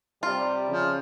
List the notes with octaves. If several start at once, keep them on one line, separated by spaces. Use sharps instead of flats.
C3 G3 F4
C#3 F3